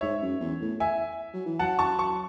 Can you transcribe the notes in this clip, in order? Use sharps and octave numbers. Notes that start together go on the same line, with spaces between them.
G#2 C#5 E5
F#2
E2
A2
E5 G#5
F#3
E3
F#3 F#5 A5
A5 C#6
A5 C#6